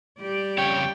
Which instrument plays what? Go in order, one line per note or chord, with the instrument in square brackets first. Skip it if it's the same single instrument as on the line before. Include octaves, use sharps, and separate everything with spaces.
[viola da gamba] G3 G4 D5
[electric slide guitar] F2 C#3 C#5 [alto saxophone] G5